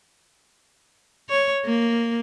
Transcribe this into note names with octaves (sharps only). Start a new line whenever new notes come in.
C#5
A#3